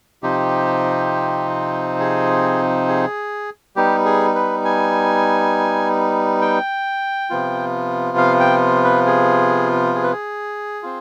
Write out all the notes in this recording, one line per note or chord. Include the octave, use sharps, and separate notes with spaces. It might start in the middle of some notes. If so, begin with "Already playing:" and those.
C3 F3 C4 D#4 G4
G#4
G#4
G3 B3 D#4 G4
G#4
B4
G#5
G5
C3 F3 B3 F4
F5
G5
B4
G#4
G#4
B4
G#4
C4 F4